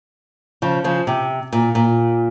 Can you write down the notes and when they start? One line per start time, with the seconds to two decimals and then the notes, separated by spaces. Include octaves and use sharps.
0.62 C#3 F3
0.84 C#3 F3
1.07 C3
1.53 A#2
1.75 A#2